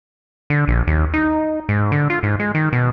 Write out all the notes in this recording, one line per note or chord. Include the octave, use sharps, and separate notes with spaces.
D3
A#1
D#2
D#4
G#2
D3
F4
G#2
G#3
D#3
B2